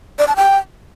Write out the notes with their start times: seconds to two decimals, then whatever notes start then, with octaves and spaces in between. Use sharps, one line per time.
0.19 D5
0.28 A5
0.36 G5